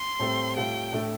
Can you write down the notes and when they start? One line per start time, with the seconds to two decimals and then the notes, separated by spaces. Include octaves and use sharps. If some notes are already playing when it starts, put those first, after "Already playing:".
Already playing: C6
0.20 A2 G3 C4 A4
0.56 A2 G3 F4 A4 F5 G5
0.92 A2 A3 D4 A4